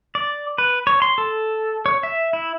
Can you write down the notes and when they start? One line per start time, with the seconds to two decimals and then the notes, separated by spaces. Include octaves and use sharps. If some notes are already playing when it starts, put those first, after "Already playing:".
0.15 D5
0.58 B4
0.87 C#5
1.02 C6
1.18 A4
1.86 C#5
2.03 E5
2.33 E4